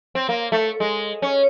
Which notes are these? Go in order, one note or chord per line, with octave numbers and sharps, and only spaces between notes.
C4
A#3
A3
G#3
C#4